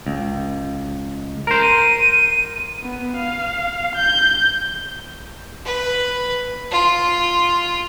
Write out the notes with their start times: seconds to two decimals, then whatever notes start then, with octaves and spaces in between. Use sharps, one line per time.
0.07 C#2
1.47 A#4 C5
1.62 D#7
2.82 B3
3.17 F5
3.96 G6
5.65 B4
6.71 F4